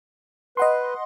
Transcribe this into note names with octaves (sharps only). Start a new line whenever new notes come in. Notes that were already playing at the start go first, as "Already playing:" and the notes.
B4 D#5 F#5 C6